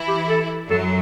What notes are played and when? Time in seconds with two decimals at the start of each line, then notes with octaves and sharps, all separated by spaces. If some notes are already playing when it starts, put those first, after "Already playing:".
Already playing: E3 E4
0.08 G4
0.29 A4
0.70 F#2 F#3 A4